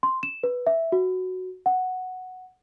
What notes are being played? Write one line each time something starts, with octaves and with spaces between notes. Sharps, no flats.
C6
E7
B4
E5
F#4
F#5